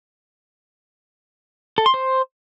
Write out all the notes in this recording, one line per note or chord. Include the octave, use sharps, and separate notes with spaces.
A4
C6
C5